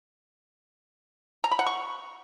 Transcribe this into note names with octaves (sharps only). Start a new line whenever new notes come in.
A#5
B5
F#5
C#6